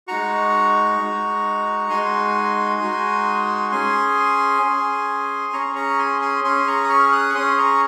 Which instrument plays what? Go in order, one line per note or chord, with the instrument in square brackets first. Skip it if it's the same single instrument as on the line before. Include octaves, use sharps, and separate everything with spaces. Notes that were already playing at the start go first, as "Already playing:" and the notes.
[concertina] G#3 D#4 F#4 A#5 C#6
G#3 D#4 F#4
G#3 D#4 F#4 G#5 C6
G#3 D#4 F#4
C#4 G#4 G#5 C6
C#4 G#4
C#4 G#4 A#5 C#6
A#5 C#6
G#5 C6
G#5 C6
C#4 G#4 G#5 C6
A#5 C#6
D#6
C#6 F6
D#6 F#6
C#6
C#4 G#4 C6 D#6
A#5 C#6